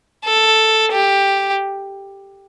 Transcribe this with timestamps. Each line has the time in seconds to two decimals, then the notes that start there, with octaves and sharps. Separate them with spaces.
0.25 A4
0.92 G4